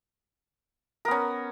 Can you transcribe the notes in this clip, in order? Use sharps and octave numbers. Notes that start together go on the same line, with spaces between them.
B3 C#4 A#4